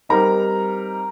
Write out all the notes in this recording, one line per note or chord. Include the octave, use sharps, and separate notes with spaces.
G3 C4 D#4 A#4 A#5